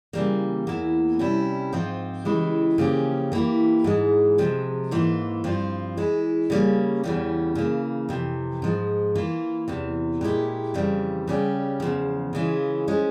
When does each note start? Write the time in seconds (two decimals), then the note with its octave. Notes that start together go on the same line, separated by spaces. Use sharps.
0.13 C#3 E3 G3 A#3
0.67 E2 E3 A#3 E4
1.19 C3 G3 C#4 E4
1.72 G#2 F3 C4 F4
2.25 C#3 E3 G#3 E4 G4
2.78 C#3 F3 A#3 C#4 G4
3.32 E3 A#3 E4 G4
3.84 G#2 E3 G#3
4.38 C3 F3 G#3
4.91 G#2 E3 A#3 F4
5.44 G2 F3 C4 F4
5.97 E3 G#3 E4
6.50 C#3 G3 A#3 C#4
7.04 E2 C#3 E3 G3 C#4
7.55 C#3 E3 A#3
8.09 F2 C3 E3
8.62 G#2 F3 G#3
9.15 E3 A#3 F4
9.68 E2 C3 E3
10.21 A#2 G#3 E4 G4
10.74 F2 C#3 E3 G3
11.27 C#3 G3 C#4 G4
11.80 E2 C#3 F3
12.33 C#3 E3 G#3 C#4 F4
12.88 F3 G#3 C#4